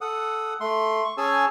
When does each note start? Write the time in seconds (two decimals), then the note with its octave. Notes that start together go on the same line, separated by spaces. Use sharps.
0.01 A4 F#5 D#6
0.60 A3 C6
1.04 C#6
1.17 C#4 G#4 C#5 G#5 A5 E6